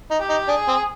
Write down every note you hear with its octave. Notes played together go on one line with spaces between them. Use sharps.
D#4
G4
D#4
D4 G#4
C4